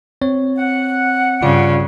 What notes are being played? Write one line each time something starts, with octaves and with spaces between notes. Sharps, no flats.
C4 C#5
F#5
G2 C#3 F4 D5